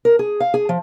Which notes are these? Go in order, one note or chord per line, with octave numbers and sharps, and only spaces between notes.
A#4
G#4
F5
G#4
F3